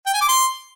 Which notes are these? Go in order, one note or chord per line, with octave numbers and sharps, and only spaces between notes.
G5
G#5
D6
C6